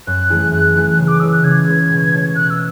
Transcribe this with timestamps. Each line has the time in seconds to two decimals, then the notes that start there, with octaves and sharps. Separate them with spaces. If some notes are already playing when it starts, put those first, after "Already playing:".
0.07 F#2 F#6
0.30 E3 A3 E4 G#4
0.52 F#2
0.76 E3 A3 E4 G#4
0.98 C#3
1.08 D6
1.20 G#3 C#4 E4 B4 E6
1.32 F#6
1.44 C#3 G#6
1.66 G#3 C#4 E4 B4
1.90 B2
2.13 A3 E4 A4 C#5
2.35 B2 F#6
2.50 E6